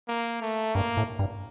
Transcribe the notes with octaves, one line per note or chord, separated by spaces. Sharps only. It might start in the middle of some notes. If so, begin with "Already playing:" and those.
A#3
A3
G2 A#3
A2
G2